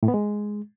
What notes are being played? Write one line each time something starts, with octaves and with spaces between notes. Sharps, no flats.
A2
B3
G#3